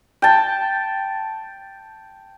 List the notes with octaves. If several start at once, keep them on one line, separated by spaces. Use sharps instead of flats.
G5 A5